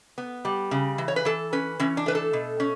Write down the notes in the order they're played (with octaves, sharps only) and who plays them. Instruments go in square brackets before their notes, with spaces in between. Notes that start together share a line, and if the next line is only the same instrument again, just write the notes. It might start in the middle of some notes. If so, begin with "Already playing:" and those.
[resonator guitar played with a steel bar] B3
G3
C#3
E3
C#5
B4
E3 A4
C#4 B4
E3 C#4
D4
A3 B4
A4
B2
C#4